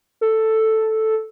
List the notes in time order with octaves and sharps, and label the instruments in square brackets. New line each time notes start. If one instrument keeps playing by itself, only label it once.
[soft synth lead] A4